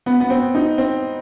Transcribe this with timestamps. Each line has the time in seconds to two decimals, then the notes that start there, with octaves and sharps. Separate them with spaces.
0.06 B3
0.20 B3
0.30 C4
0.55 D#4
0.78 C4